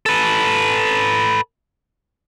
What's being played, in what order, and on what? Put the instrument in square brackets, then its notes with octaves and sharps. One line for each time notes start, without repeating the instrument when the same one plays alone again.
[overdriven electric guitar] A4 B4